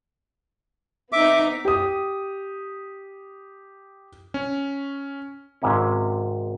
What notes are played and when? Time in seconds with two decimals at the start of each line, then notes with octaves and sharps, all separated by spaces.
1.12 B3 C4 D#4 E5 D6
1.65 G4 D#6
4.34 C#4
5.62 G#1 G#2 C3 C#4